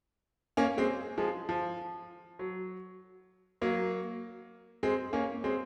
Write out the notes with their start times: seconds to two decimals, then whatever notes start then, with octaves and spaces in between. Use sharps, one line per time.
0.57 A#3 C#4
0.78 G#3 C4
1.18 F3 G#3
1.49 F3
2.39 F#3
3.62 F#3 A#3
4.83 G#3 C4
5.13 A#3 C#4
5.44 G#3 C4